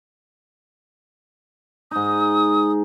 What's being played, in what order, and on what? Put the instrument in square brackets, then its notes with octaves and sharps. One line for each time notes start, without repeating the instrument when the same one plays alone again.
[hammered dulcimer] G#2 D#4 [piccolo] D#6